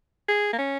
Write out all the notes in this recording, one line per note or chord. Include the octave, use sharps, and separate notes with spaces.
G#4
A#3
C#4